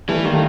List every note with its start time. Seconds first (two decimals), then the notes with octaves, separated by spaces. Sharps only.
0.08 E3 G3 A3
0.25 D#3 A#3
0.33 A3